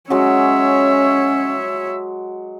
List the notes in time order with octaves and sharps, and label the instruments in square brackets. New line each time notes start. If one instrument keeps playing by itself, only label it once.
[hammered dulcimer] F#3 G#3 F#4 [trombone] C#4 [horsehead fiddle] C#5 E5